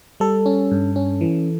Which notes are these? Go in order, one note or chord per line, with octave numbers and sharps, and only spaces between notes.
G3 A4
C#4
G2
C#4
E3